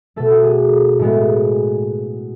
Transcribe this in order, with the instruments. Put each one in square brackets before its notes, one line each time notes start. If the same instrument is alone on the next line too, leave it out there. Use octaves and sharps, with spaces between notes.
[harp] B2 A3 A4
F#4
G#4
A2 G#3 B3